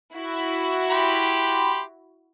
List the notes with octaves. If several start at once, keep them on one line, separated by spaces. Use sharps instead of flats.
E4 F#4
G4 B5 C6